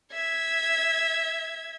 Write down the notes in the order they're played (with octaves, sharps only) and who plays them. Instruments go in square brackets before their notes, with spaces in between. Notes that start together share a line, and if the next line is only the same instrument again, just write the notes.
[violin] E5 G#6